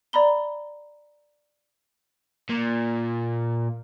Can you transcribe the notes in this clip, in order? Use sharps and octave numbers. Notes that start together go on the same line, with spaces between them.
D5 A#5 B5 G7
A#2